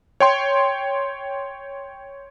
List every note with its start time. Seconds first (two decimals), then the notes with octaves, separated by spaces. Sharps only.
0.20 C#5 G5 C6